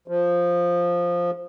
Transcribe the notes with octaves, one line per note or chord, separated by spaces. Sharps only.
F3